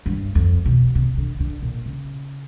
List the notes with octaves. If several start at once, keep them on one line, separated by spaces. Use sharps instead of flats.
G2
F2
B2
C3
D3
D3
A#2
C#3